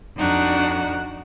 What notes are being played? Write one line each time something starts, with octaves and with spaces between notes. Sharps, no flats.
F2 D4 D#4 F#4 F#6